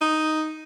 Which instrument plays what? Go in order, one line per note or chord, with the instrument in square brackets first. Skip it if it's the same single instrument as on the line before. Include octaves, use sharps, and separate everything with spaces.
[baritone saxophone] D#4